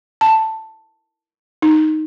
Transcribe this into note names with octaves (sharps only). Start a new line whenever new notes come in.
A5
D#4